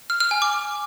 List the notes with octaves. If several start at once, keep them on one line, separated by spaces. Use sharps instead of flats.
F6
F6
G#5
D6